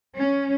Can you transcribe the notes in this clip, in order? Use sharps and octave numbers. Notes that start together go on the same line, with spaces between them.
C#4